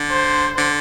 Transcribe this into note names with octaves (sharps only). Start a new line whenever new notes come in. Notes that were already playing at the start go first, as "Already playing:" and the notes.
Already playing: D3
C5
D3